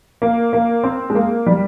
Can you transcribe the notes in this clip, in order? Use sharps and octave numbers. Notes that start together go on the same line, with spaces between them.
A#3
A#3
C4
G#3
A#3
G3